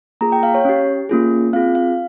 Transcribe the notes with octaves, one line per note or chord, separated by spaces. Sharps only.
A#3 F4 G#4 A#5
G5
F5
C#5
C#4 G4
A#3 C#4 F4 G#4
C4 F4 G#4 F5
F5